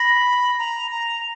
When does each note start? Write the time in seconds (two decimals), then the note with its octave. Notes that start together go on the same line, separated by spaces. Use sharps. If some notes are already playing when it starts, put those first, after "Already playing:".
Already playing: B5 A#6
0.59 A#5
0.91 A#5